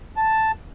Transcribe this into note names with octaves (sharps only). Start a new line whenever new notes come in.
A5